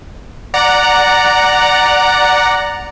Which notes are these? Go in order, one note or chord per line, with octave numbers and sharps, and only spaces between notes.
D5 F#5 A#5